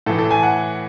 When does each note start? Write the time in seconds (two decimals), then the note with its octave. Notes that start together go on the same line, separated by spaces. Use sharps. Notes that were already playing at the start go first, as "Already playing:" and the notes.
0.06 A2 E3 A4
0.18 A4
0.31 G#5
0.43 F#5